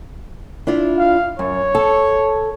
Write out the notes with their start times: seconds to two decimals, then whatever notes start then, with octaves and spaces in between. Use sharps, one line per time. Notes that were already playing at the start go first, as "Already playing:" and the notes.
0.67 D4 E4 F4
0.98 F5
1.39 F#2 C#5
1.75 A4 A5